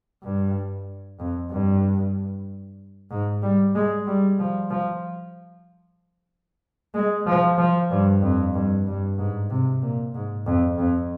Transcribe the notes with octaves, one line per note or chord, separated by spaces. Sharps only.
G2
F2
G2
G#2
G3
G#3
G3
F3
F3
G#3
F3
F3
G2
F2
G2
G2
G#2
C3
A#2
G#2
F2
F2